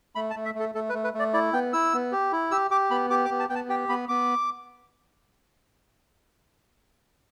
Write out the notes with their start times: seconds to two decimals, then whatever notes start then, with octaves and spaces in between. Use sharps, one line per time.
0.15 A3 B5
0.30 A5
0.35 A3
0.45 E5
0.55 A3 A4
0.75 A3 A4
0.89 B4
0.94 A3
1.04 B4
1.14 A3 D5
1.33 E4 D5
1.53 B3 G5
1.73 E4 E6
1.93 B3
2.12 G4
2.32 E4
2.51 G4 E6
2.71 G4 D6
2.91 B3 B5
3.10 G4 D6
3.25 D6
3.30 B3
3.39 A5
3.49 B3 G5
3.55 A5
3.69 G4 G5
3.89 B3 B5
4.08 B3 D6